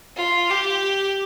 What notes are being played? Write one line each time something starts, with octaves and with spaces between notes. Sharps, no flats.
F4
G4